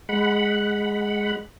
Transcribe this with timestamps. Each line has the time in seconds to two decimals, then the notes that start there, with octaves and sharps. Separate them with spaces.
0.09 G#3 F#5 B5